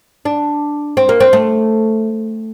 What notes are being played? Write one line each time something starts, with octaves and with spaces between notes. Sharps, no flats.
D4
C4
A#3
C4
A3